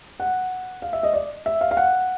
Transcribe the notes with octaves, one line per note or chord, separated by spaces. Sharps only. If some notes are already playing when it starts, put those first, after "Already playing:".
F#5
F5
E5
D#5
D5
E5
F5
F5
F#5